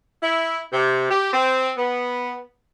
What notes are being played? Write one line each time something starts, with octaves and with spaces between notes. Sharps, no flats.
E4
C3
G4
C4
B3